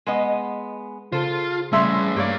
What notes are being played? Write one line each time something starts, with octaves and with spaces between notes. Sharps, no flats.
G#3 B3 D#5
C#3 F4 A4 C5
G3 A3 C#4 G#4 E5 C6
G2 A#3 G4 C#5 D5 F5